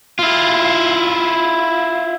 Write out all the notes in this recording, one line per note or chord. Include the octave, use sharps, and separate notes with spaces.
E4 F4